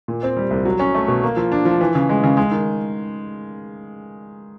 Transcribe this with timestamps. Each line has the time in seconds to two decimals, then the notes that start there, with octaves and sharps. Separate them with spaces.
0.08 A#2
0.23 C4
0.37 G3
0.51 C2
0.65 F#3
0.79 C#4
0.95 A3
1.08 B2
1.23 A#3
1.37 F3
1.52 D4
1.65 F3
1.81 E3
1.95 C#3
2.09 G#3
2.23 C#3
2.37 G#3
2.51 D#3